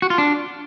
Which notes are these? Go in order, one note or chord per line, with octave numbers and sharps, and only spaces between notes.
F#4
F4
D4